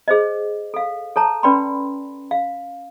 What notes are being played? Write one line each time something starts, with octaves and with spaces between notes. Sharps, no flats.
G#4 C5 D#5
A4 F5
A4 C#5 A5 A#5
C#4 B4 D5 G5 B5 C6
F5